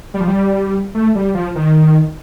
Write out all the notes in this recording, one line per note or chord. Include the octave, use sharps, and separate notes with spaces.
G3
F3
G3
A3
G3
F3
D#3